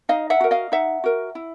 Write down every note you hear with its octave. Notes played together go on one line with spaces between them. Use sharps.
D#4 D#5 F5
E5 F#5
F#4 A#4
D#5 F5
D#4 E5 F#5
F#4 A#4
E4